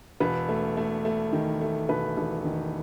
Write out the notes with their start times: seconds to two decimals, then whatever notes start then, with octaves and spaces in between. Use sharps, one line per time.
0.20 E1 B4
0.49 A3
0.77 A3
1.05 A3
1.33 D#3
1.61 A3
1.89 E1 B4
2.17 E1
2.45 D#3